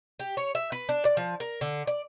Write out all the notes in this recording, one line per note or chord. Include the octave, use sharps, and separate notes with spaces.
G4
C#5
E5
B4
D4
D5
F3
A#4
D3
D5